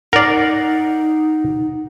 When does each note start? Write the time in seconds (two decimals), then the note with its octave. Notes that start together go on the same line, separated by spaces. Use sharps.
0.13 D#4 A#4 D5 F#5 C7